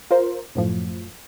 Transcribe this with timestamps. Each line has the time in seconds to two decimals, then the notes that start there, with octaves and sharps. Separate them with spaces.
0.11 F4 A#4 C5
0.55 F#2 A2 F3